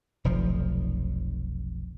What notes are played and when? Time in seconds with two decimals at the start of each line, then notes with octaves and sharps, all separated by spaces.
0.24 F1 B1 F3